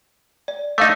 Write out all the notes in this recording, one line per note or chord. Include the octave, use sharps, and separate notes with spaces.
D5
A3 D#4 D#5 F5 D6